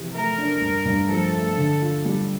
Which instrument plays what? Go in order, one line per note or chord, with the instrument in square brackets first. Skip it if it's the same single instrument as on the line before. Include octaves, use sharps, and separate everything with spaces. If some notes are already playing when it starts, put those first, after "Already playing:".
Already playing: [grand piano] C3 E3 F3 G4
[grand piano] A3 [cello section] A#4
[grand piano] D4
G2
G2
[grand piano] F3 [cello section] A4
[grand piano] A3
D3
F4
G3